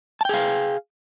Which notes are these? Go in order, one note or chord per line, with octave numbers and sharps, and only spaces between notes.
G#4 F5 G5 A5